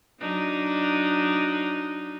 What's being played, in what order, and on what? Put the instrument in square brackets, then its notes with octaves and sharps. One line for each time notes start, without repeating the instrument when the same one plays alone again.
[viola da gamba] F#3 D4 D#4